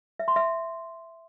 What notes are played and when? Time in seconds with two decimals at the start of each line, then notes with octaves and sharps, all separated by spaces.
0.19 E5
0.28 C6
0.36 E5